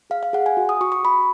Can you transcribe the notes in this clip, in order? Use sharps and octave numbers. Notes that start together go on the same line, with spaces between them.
G#4 F5
F5
G#4 F#5
G#5
F#4
D#6
F#4 C#6
C#6
F#4 B5